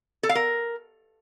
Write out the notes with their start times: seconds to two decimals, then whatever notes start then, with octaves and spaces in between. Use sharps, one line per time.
0.23 A4
0.29 F5
0.35 A#4